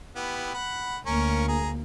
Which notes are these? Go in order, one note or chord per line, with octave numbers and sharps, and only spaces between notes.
B3 E4 G4
F#5 B5
D2 A#3 C#4 A#4 C#6
G#4 A#5